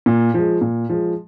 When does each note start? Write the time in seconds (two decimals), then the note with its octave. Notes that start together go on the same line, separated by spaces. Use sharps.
0.06 A#2
0.34 F3 G#3
0.61 A#2
0.89 F3 G#3